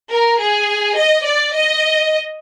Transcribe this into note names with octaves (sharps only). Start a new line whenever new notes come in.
A#4
G#4
D#5
D5
D#5